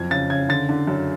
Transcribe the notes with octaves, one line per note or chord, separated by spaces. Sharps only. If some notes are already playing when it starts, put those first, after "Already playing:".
Already playing: F#1 F2 G#6
C#3 A6
C#3 G#6
D3 A6
D3
F#2